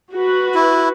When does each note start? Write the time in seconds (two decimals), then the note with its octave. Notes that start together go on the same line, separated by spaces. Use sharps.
0.14 F#4 B4
0.55 E4